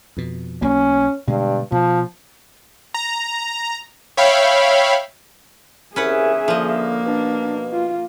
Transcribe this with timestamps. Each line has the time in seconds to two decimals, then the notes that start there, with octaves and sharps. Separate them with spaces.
0.17 F2 B2
0.62 B1 F#3 A#3 C#4
1.27 G2 B2 D3 G#3
1.72 B2 F3
2.94 A#5
4.17 C#5 E5 F5 G5 B5
5.96 C2 C#4 G#4 B4 E5 F#5
6.48 D3 F3 A#3 D#5
7.05 B2 D4
7.72 F4